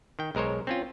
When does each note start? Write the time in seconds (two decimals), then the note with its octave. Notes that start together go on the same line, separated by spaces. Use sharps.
0.19 D#3 G5
0.35 B1 G#3 A#4 C5 C#5
0.67 C4 C#4 F4